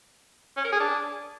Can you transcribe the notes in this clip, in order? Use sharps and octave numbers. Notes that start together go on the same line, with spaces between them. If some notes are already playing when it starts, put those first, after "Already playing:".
C#4
A#4
G#4
D4